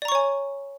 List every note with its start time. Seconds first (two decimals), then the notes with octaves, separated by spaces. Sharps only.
0.02 D5
0.05 A#5
0.08 C#6
0.12 C#5
0.15 G#5